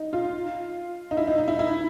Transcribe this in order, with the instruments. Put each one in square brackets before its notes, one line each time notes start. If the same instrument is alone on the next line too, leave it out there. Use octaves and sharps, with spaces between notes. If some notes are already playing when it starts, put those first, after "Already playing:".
Already playing: [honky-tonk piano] D#4
F4
D#4
E4
D#4
D#4
E4
E4